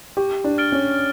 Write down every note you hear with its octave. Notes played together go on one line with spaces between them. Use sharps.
G4 C#6
D4
F6 A6 D7 G7
C#4